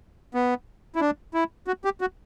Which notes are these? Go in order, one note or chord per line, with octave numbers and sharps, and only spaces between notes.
B3
E4
D4
E4
F#4
G4
F#4